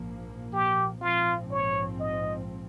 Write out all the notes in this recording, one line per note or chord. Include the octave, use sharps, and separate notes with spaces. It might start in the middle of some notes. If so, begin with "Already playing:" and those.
Already playing: A#1 G#2 F3 A#3
G4
A#1 G#2 F3 C4 F4
C#5
D#5